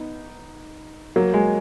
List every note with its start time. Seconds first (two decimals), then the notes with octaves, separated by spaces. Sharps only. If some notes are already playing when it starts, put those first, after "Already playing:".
Already playing: B3 D#4
1.16 F#3 A#3
1.34 G#3